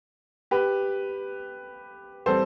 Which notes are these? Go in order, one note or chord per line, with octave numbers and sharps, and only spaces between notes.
G4 B4
E3 G3 C4 A4 C5